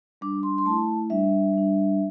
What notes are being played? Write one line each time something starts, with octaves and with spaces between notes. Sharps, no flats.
G3 D4 D6
C6
C6
A3 E4 A5
G3 D4 E5
G3 D4